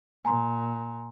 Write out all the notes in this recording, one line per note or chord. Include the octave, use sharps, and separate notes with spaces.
A#2 G#5 A#5 C6